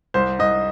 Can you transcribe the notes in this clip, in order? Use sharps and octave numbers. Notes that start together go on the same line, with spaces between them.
C2 C5
C2 D#5